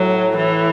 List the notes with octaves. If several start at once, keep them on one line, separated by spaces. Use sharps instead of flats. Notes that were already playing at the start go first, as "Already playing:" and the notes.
Already playing: A2 F#3
E3